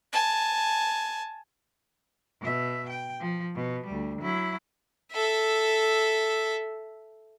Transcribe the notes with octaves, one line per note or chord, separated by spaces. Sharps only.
G#5 A5
B2 E5
G5
F3
B2
D2 G3
F#3 E4
A4 E5